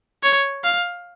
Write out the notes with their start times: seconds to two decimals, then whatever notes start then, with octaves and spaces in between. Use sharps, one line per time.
0.23 C#5
0.64 F5